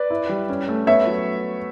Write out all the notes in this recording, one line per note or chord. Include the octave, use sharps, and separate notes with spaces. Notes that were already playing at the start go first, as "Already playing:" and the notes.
Already playing: B4 D5
E4
G3
C#4
A3
B3 C#5 E5
F#3